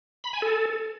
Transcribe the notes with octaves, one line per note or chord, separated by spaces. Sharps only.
B5
G#5
A4